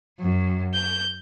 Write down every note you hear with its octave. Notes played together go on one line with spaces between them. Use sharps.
F#2
G6